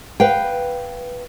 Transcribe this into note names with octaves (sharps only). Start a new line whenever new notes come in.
B4 F5 G5